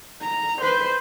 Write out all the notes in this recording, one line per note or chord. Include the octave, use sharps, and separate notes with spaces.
A#5
B4 C5